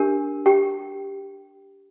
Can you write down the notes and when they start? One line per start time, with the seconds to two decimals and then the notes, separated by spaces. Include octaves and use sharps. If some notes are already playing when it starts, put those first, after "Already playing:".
Already playing: D4 G4 A#4
0.46 G4 G5